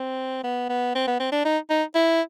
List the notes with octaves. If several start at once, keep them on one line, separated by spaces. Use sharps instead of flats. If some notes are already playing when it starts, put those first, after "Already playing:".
Already playing: C4
B3
B3
C4
B3
C4
D4
D#4
D#4
E4